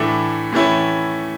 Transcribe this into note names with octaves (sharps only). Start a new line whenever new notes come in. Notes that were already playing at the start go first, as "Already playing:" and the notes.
Already playing: A2 E3 A3 D4 A4
A2 E3 A3 C#4 E4